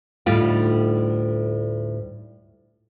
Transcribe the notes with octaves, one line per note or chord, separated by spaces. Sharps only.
D2 A2 G3 D#4 F4 G5